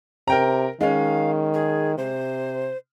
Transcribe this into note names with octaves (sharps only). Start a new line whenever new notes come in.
C3 A#4 G5 A#5
D#3 G#3 C#4 F5
G#4
C3 C5